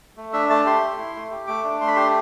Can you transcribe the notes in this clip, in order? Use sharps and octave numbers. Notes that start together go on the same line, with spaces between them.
A3
D4 E5
A3 A5
G4 C6
A3
E4
A3
G4
A3 D6
D4
A3 C6
B5
G4 C6